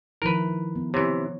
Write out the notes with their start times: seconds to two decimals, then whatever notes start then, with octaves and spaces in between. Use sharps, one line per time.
0.22 D#3 F3 E4 A#4 B4
0.47 F3
0.75 B3
0.94 C3 E3 C#5